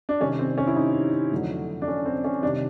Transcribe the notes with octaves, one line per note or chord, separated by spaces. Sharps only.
D4
C3 D#3 G3 C#4
C4
C#4
E4
D#4
F2 D3 F#3 A3
D4
C#4
C4
C#4
C3 D#3 G3 D4